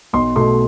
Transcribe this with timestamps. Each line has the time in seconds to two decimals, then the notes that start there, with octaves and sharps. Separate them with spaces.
0.13 B1 C6
0.36 B2 A3 C6